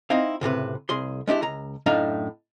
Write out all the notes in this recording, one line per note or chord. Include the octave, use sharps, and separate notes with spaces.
C4 D#4 E4 F5
C#2 A2 C3 B4
C2 G#4 C6
G#3 D4 E4 G4
C#2 A#5
F#2 A2 D4 D#4 F5 A#5